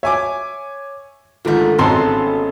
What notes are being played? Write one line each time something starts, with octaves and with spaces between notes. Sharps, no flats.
C#5 E5 G#5 D6
G#2 D3 D#3 F3 A3
G#1 C#3 B3 F#4 A4 A5 A#5 C6